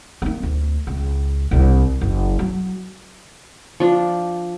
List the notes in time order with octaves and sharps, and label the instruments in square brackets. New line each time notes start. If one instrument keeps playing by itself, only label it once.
[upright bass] A#3 D#4
D2
C#2
C2 D4
F#1
F#3
[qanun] F3 D4